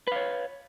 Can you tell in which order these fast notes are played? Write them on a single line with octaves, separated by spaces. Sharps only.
B4 F5 C#5